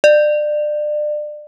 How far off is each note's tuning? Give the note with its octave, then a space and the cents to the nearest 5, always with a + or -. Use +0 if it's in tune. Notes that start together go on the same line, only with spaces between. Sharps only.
D5 +30